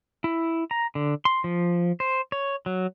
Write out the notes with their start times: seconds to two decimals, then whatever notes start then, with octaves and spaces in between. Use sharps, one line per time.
0.24 E4
0.71 A#5
0.95 D3
1.25 C6
1.44 F3
2.00 C5
2.32 C#5
2.66 F#3